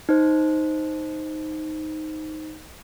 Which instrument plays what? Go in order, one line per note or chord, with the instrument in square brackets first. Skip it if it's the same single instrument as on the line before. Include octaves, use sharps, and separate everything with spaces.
[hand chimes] D#4 C5